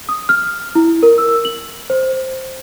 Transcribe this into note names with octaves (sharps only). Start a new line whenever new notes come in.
D#6
F6
E4
A#4
E6
F#7
C5